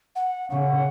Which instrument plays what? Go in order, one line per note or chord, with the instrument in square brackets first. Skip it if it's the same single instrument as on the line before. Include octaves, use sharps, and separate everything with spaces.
[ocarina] F#5
[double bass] C#3 [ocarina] F#5